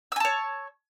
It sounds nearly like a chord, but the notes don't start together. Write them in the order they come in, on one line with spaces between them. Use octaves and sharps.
E6 G#5 A5 C#5